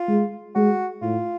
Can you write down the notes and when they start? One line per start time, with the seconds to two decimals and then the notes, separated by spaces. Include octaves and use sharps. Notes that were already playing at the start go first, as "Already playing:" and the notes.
Already playing: F4
0.09 G#3
0.55 G#3 F#4
1.02 A2 F4